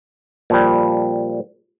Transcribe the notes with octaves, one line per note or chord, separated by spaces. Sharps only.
A#2 F3 G3